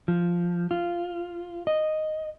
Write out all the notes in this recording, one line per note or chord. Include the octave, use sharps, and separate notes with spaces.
F3
F4
D#5